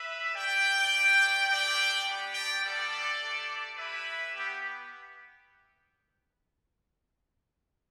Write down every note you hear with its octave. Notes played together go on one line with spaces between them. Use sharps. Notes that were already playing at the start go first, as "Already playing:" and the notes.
Already playing: B4 E5
A3 G4 D5 G5
A3 D4 G4
A3 D4 G4 D5 G5
B3 D4 G4
D5 G5
G3 B3 D4 G4 A4 D5
A3 D4 G4
A3 E4 G4 B4 E5
B3 G4